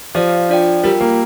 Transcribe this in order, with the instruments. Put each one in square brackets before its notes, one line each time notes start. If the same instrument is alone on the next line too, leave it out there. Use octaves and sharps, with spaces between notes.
[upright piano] F3 [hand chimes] G4 D5 F5
[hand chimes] D4 F4 D5 G5
[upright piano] G3 [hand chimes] F4 A#4 G5
[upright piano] A#3